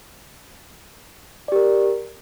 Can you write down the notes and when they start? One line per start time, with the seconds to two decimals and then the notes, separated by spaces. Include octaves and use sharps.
1.48 D5
1.52 G4
1.56 A#4